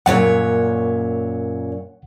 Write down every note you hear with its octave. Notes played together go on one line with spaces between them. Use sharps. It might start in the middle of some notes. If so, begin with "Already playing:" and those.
F#2 A#2 C#5 F#5